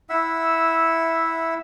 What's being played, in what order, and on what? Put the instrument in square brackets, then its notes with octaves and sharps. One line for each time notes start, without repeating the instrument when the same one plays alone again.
[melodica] E4 E5 F#5 E6